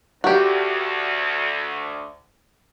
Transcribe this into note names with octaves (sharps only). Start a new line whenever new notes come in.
D2 F#4 G4